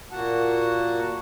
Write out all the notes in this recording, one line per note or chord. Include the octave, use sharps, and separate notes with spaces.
A#2 A#3 F#4 F#5 A5